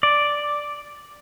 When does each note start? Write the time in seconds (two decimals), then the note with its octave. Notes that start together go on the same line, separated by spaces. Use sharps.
0.03 D5